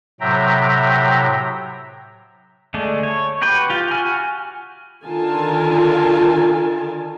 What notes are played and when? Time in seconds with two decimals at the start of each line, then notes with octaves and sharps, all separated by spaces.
0.20 A2 C3 F#3 E5 G5 A#5
2.74 D3 G#3 A3 D4
3.03 C#5
3.42 F#4 G4 B4 G5
3.70 F4 G4
3.90 F#4 G#5 F6
5.04 D3 D#3 F4 A#4 G#5 A5